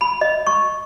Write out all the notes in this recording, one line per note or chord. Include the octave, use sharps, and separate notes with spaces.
B5
D#5
C#6